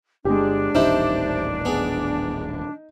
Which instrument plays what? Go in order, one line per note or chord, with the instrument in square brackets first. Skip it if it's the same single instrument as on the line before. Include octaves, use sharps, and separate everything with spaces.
[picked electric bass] G1 [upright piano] G#3 G4 [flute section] D4
[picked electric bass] D#1 A1 D#3 [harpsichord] C4 E4 G4 [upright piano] D#4
[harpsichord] B3 G#4